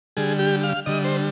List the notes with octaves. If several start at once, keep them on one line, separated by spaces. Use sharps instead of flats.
D3 G3 G#4
G4
F5
D3 G3 D#5
C5